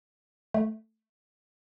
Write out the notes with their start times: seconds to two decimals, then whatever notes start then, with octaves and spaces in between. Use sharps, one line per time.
0.54 A3